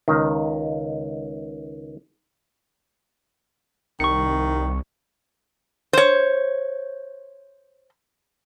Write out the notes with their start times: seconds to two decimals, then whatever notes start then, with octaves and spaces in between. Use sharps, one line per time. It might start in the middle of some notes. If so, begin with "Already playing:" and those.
0.08 C#2 D#3
4.00 C2 D#3 C#6 C#7
5.93 C5 C#5